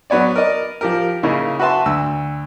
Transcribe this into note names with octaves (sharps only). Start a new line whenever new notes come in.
F#3 B3 C#5 D5
A#4 D5 D#5
F3 G4 A#4
C#3 A#3 D#4 E4
F#4 B4 E5 A5 C6
D2 E6